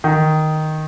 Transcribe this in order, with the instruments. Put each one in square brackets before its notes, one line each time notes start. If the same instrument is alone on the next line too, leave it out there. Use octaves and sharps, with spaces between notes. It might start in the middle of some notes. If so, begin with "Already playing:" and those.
[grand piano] D#3